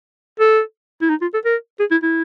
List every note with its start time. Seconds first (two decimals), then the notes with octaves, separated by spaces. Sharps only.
0.40 A4
1.01 E4
1.09 D#4
1.21 F4
1.34 A4
1.45 A#4
1.80 G#4
1.91 E4
2.03 E4